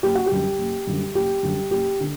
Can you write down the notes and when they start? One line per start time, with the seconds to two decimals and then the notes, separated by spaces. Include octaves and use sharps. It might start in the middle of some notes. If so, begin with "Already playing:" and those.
0.03 F#1 G4
0.15 F#4
0.26 G4
0.31 F#2 D3 G3
0.59 F#1
0.87 F#2 D3 G3
1.15 F#1 G4
1.43 F#2 D3 G3
1.71 F#1 G4
2.00 D3